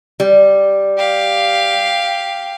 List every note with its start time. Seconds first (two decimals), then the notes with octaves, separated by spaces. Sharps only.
0.20 G3
0.97 G4 F5